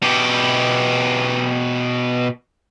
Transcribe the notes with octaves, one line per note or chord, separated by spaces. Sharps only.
B2 G4